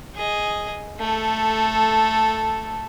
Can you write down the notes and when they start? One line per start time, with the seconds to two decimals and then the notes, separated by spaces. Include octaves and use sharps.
0.15 G#4 D#5
0.99 A3 A4